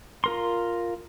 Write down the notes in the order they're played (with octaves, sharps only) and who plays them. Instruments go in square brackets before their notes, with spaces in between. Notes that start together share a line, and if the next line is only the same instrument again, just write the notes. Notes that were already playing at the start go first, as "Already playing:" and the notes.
[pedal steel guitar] F4 A#4 C6